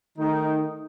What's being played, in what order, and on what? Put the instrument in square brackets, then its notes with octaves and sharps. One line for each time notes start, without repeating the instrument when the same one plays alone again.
[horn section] D#3 A3 D#4